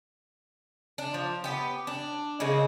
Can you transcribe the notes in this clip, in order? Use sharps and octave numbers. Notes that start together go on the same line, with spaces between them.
D4
F3
B3 G4
D4
C#3 G#3 A#3 C4